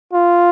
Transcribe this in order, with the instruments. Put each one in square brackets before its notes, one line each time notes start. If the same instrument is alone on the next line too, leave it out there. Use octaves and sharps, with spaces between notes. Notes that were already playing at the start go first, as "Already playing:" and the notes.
[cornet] F4